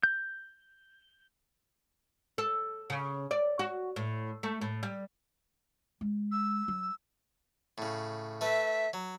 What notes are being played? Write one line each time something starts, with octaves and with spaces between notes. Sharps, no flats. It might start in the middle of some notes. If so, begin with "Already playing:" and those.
G6
A4
C#3
D5
F#4
A2
A3
A2
G3
G#3
E6
F#3
A2 C#3
A3 B4 E5
F#3